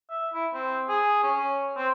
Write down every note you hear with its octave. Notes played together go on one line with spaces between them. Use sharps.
E5
E4
C4
G#4
C#4
C4